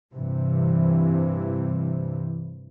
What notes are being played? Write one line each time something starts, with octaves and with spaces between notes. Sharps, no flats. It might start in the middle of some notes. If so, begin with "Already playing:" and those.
G2 C3 E3